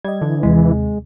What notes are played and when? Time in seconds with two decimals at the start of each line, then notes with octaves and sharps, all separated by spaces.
0.04 G3 D#5 G#6
0.21 D3 E3
0.43 D#2 C3 G#3